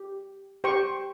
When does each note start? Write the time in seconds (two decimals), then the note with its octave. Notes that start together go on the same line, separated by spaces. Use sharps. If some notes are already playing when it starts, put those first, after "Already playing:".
Already playing: G4
0.64 G4 C5 G5 C#6